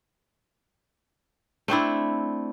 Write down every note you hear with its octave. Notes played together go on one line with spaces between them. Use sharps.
A3 C4 D4 E4